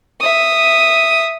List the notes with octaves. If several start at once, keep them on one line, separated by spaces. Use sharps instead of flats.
E5 D#6